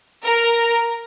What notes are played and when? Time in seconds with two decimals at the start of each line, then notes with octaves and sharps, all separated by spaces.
0.24 A#4